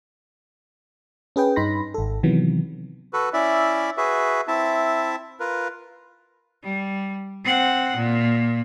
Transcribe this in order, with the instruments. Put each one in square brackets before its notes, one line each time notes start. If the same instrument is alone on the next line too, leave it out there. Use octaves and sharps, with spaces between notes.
[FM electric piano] C#4 G#4 B4 G5
G2 D#4 B5 C6 A#6
G#1 A4
C3 D#3 E3 F#3 B3
[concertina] F#4 A4 B4
C#4 E4 D5 E5
F#4 G#4 B4 E5
C4 E4 E5 A5
F4 A#4 B4
[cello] G3
C4 F#5
A#2